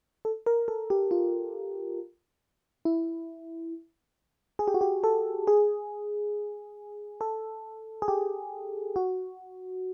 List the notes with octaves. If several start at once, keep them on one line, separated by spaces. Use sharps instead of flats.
A4
A#4
A4
G4
F4
E4
G#4
G4
F#4
G4
A4
G#4
A4
G#4
G4
F#4